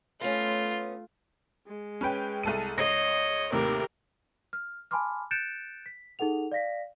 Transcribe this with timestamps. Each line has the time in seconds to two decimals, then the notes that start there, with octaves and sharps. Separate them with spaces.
0.21 A3 B3 C#4 F4
1.67 G#3
2.01 C#4 B4 G5
2.43 C2 A4 D#7
2.78 C#2 C#5 D#5 A#6 C7
3.52 D#2 A2 C3 G4 A#4
4.53 F6
4.91 G#5 A5 B5 C6 D6 F6
5.31 F#6 G6 A6 C#7 D7 E7
5.86 B6
6.19 D#4 G#4 A4 F#5 F7
6.52 D5 F5 A#6 B6